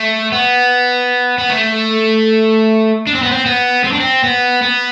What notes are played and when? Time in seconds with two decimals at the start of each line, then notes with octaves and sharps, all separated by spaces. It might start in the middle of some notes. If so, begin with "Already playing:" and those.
Already playing: A3
0.32 B3
1.38 B3
1.50 A3
3.07 D4
3.15 C4
3.23 B3
3.31 C4
3.46 B3
3.84 C4
3.92 D4
4.00 C4
4.24 B3
4.63 B3